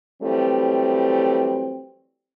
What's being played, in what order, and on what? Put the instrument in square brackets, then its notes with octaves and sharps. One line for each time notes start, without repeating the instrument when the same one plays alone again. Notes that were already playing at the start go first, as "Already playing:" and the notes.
[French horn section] E3 F#3 G3 A3 C4